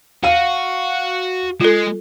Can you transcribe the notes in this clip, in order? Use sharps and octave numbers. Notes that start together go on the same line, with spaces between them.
F#4 F5 D#7
G#3 F4 A4